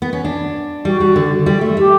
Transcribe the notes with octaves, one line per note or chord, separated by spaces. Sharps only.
B3
C#4
D4
G3 F#4
G3
D3
G3
A3
A3 G4